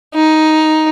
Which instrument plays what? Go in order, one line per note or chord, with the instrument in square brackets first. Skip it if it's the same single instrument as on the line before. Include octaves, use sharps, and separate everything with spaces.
[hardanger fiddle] D#4